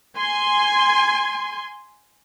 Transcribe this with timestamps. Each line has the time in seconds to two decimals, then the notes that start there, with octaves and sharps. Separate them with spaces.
0.17 G#5 C6